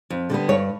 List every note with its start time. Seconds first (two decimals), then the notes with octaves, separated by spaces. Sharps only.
0.10 F2
0.30 D3 G3 B3
0.49 G2 C#5